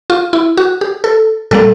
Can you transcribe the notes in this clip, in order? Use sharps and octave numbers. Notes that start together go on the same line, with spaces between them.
F4
E4
F#4
G4
A4
A#2 G3 A#3 A4